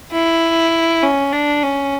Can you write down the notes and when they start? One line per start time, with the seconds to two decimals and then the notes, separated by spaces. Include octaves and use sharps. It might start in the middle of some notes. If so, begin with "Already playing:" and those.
0.12 E4
1.02 C#4
1.32 D4
1.62 C#4